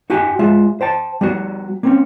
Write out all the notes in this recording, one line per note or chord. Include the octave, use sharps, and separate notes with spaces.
D#4 F#4 G4 G5 G#5
G#3 F4 E5
C5 G5 A5
G3 B3 F#4
A#3 C4 C#4